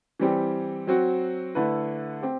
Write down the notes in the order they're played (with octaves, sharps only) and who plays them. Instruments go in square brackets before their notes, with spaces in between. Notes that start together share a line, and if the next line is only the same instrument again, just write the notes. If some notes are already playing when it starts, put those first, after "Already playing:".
[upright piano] E3 G3 C4 G4
F#3 C4 F#4
D3 A3 E4 B4
C4 G4